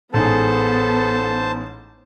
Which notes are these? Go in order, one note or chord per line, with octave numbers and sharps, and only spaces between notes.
A1 G#2 B3 G#4 A4 C5 A5